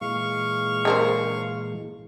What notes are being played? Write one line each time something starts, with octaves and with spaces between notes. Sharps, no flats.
A#2 E3 G#3 F5 C#6
D3 A#4 C5